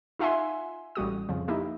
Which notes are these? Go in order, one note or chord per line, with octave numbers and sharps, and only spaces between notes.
D#4 F4 E5 F#5 G#5 C6
A1 G3 F#4 D#6
F2 C#3 F3
A#3 D#4 E4 G4